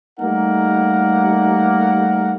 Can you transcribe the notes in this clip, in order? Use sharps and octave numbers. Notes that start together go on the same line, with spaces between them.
G3 A3 A#3 D#4 A#4 F#5